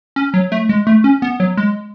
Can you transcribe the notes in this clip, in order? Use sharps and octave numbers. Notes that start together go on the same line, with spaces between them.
C#4
F#3
A3
G#3
A3
C#4
B3
F#3
G#3